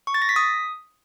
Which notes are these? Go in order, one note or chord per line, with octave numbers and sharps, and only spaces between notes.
C#6
A6
A#6
B6
D#6